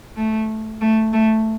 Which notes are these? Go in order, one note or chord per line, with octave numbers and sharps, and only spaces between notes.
A3
A3
A3